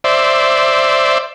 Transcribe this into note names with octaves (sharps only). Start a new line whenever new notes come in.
C5 D5 E5